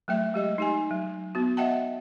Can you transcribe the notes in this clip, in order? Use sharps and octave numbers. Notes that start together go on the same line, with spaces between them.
F#3 A3 E5 G5
G#3 G4 D#5
D#4 G4 G#5
F#3
B3 F#4
D#5 E5 F#5 G5 A5